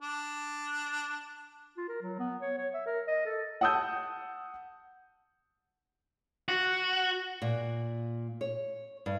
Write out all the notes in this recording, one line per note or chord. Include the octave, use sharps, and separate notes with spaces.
D4
F4
A#4
F#3
B3
C#5
C#5
E5
A#4
D#5
A4
F#5 A5 D#6 E6 G6
F#4
A#2
C#5
G2